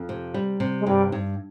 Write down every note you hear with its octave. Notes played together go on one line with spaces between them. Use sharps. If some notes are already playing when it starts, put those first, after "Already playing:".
Already playing: F2
C3
G3
C3
G#3
G2 G3
G2